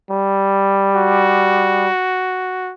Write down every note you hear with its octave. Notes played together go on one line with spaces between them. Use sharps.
G3
F#4